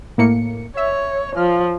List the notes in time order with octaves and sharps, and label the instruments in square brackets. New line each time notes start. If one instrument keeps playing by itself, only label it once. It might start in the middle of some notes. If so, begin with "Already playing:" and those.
[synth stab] A2 A#3 C#7
[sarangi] C#5 [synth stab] E5
[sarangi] F3 [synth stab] F6